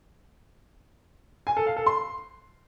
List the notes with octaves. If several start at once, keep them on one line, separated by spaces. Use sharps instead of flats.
G#5
A4
F5
A4
C6